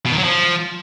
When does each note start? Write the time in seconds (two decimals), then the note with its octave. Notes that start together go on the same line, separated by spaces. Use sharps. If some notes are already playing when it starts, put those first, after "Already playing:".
0.06 B2
0.12 D#3
0.18 F#3
0.24 F3